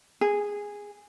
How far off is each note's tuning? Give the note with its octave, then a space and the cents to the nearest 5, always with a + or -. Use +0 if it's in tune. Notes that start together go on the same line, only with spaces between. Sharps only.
G#4 -10